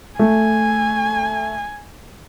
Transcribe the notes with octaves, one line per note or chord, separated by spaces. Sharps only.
A3 G#5